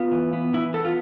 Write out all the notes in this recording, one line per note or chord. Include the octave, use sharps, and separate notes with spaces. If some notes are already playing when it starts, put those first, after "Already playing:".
Already playing: B3 F4
E3
B3
E3 E4
B3 A4
F4